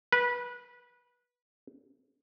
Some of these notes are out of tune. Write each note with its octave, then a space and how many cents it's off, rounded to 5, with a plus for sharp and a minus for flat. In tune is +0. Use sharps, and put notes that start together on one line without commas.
B4 -20